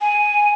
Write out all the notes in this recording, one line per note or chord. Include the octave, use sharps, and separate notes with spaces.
G#5